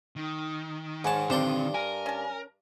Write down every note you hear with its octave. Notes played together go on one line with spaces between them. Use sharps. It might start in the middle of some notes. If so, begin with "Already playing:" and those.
D#3
G#2 C#5 F#5 G#5 A5
G2 D3 C4 D4 A4 C5 C6
A#4 G#5
C#4 A5